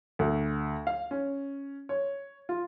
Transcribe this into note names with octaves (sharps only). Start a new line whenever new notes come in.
D2
F5
C#4
C#5
F4